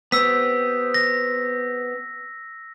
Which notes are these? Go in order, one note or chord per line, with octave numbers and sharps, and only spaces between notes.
B3 C4 G4 E6 B6
A#6